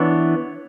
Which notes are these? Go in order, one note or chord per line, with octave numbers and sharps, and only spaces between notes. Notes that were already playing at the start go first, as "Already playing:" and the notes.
Already playing: E3 B3 D4 C#5